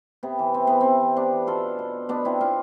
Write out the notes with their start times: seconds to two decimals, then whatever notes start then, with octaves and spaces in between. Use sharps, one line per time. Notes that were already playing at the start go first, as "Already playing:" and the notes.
0.23 C3 B3
0.39 E3
0.54 C3 C4
0.67 E3 B3
0.81 C3 C4
1.01 E3
1.16 C3 B3 D4
1.31 E3
1.47 B2 F4 A4
1.79 B2
2.09 B2 B3 D4
2.25 C4 E4
2.41 B2 D4 F4